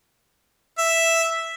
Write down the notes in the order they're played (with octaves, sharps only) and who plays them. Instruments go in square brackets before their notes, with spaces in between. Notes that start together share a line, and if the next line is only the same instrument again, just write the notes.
[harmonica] E5